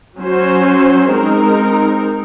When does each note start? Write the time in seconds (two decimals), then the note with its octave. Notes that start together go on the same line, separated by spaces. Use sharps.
0.18 F#3 C#4 F#4 C5
1.10 G#3 C4 D#4 A#4